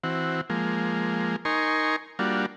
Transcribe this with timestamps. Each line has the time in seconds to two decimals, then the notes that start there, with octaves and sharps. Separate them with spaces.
0.04 E3 C4 F#4
0.50 F3 G#3 A#3
1.45 D#4 A#4 G#5 C6 C#6
2.19 G3 A#3 D4 F4 F#4